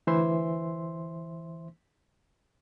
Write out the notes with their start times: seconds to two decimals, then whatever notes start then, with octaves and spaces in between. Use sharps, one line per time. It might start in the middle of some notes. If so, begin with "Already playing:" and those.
0.07 D2 E3 C5 E5 C6